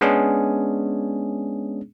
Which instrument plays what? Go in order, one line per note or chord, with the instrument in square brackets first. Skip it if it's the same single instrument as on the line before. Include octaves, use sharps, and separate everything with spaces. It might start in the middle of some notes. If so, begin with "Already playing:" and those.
[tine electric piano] G#3 B3 C#4 D4 G#4